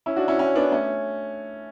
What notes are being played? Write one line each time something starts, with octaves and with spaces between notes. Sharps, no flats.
C#4 E4
D4 F#4
C#4 E4
C#4 E4
B3 D4
A3 C#4